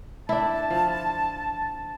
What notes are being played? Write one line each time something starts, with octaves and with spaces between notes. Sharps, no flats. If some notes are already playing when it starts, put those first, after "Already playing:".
D4 E4 A5
F3